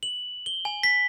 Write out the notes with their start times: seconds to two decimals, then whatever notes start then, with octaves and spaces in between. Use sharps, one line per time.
0.03 F#7
0.46 G7
0.65 G#5
0.83 B6